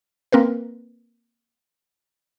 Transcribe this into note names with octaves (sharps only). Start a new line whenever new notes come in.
A#3 C4 A#4 B4